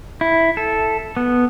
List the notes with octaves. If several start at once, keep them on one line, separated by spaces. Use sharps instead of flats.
E4
A4
B3